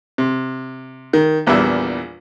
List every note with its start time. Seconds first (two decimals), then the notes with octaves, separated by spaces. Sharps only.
0.18 C3
1.13 D#3
1.47 A#1 E2 E3 G3 E5